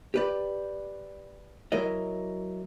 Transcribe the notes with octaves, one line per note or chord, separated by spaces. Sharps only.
G4 B4 D5
F#3 E4 A#4 D#5